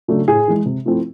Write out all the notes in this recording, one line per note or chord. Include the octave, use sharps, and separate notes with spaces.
C#3 F#3 A3 D4
A2 G#4
E3 G#3
C3
F3 A3 C4 E4